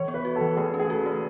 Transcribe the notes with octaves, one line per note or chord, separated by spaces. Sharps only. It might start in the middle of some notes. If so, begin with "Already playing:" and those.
Already playing: E3 C#5
B3
B4
F#4
A4
E3
A3 G#4
C#4
G#4
F#4 A4
A3